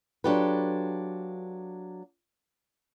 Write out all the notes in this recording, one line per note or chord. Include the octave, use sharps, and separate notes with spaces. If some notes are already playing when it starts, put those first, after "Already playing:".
F#3 D4 F4 G4 A4 B4